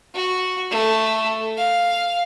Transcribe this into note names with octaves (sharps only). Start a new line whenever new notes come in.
F#4
A3
F5